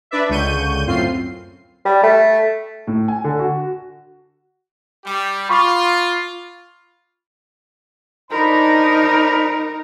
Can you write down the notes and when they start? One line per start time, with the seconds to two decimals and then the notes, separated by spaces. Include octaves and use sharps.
0.11 D4 B4 D5 E5
0.29 C#2 D3 C#6 G6 D#7
0.86 F#2 A2 C4 F4 C7
1.85 G3
2.03 A3
2.87 A2
3.08 G#5
3.24 D3
3.39 F#4
5.05 G3 G4
5.49 F4 B5 C#6 D6
8.31 D4 D#4 A#4 C5 B5